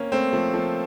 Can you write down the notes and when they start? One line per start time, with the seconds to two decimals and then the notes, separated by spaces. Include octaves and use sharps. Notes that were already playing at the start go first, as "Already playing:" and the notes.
Already playing: A#3 C4 C#4
0.12 A3 C4
0.33 F3 A3
0.54 F3 A3